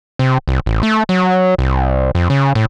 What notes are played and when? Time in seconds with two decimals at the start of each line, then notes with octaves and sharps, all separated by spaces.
0.19 C3
0.48 C2
0.66 A1
0.83 A3
1.09 F#3
1.58 C2
2.15 F2
2.30 C#3
2.55 A2